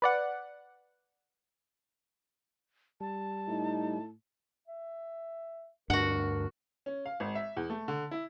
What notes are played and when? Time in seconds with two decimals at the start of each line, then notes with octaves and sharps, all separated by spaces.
0.02 B4 D5 F#5
3.00 G3 A5
3.48 A2 D#4
4.68 E5
5.90 D2 G2 D4 F#4 A#4 F#5
6.86 C#4
7.06 F5
7.20 G#1
7.35 E5
7.57 E2
7.70 A3
7.88 D3
8.11 E4